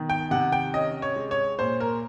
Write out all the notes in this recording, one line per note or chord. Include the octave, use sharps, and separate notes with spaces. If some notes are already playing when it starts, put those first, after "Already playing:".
Already playing: B2 D#3
G5
C3 F#5
G5
C#4 D#5
C#5
G#3
C#5
A#2 C5
A#4